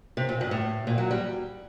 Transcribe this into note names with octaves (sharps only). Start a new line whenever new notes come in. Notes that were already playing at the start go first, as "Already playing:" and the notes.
C3
A#2
G2
A2
A#2
F#3
G3